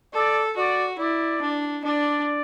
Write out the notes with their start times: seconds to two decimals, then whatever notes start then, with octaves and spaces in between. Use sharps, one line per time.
0.14 A4 D5
0.57 F#4 D5
0.99 E4 D5
1.41 D4
1.84 D4 D5